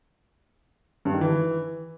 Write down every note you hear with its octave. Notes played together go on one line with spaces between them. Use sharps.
G2
D#3
E3